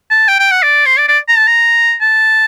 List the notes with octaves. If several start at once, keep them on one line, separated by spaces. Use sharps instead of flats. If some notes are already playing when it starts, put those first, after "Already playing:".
A5
G5
G5
F#5
D5
C5
D5
D5
A#5
A5
A#5
A5